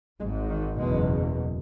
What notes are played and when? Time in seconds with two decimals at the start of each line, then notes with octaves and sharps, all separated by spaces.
0.21 G#1 G#3
0.26 G#2
0.50 D#3
0.79 F#1 E2 B2 G#3